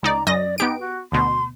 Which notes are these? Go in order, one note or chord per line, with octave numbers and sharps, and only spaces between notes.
C#2 D#4 D5 A#5
F#2 D5 D#5 A#6
B3 D#4 G4 D7
F#4
D2 B2 C6